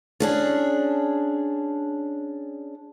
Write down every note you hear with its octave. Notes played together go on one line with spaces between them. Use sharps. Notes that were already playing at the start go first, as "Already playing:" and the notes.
C#4 D4 G#4